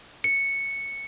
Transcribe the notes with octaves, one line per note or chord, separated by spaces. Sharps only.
C#7